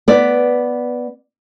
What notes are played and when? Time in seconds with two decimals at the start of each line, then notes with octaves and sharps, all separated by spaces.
0.08 B3 D5